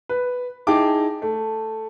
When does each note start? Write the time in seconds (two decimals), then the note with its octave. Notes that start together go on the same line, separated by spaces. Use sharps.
0.09 B4
0.67 D#4 E4 G#4 G5 A5 D6
1.22 A3